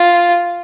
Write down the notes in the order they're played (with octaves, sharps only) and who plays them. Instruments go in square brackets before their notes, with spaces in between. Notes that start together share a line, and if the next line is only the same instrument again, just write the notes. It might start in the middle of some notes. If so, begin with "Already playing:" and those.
Already playing: [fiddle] F4